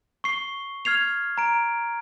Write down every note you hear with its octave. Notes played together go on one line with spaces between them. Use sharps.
C#6 C7 G7
F6 G#6 C7 F7
A#5 D7